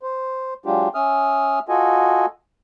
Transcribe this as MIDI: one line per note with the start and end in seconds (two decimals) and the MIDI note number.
0.03 0.54 72
0.66 0.89 54
0.66 0.89 56
0.66 0.89 62
0.66 0.89 65
0.66 0.89 67
0.95 1.59 61
0.95 1.59 76
0.95 1.59 87
0.95 1.59 89
1.69 2.26 65
1.69 2.26 66
1.69 2.26 69
1.69 2.26 75
1.69 2.26 80